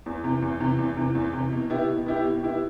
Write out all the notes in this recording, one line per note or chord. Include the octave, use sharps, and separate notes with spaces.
E2
C3 E3
E2
C3 E3
E2
C3 E3
E2
C3 E3
B2
B3 E4 G4
B2
B3 E4 G4
B2
B3 E4 G4